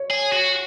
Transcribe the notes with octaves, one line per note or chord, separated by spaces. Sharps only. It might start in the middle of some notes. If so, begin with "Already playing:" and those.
Already playing: C#5
G#4
F#4